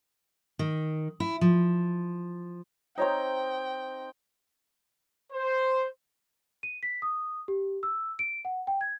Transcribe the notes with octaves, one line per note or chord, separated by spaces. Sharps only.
D#3
E4
F3
C4 D#4 C5 C#5 G5 A#5
C5
D#7
B6
D#6
G4
E6
D7
F#5
G5
G#6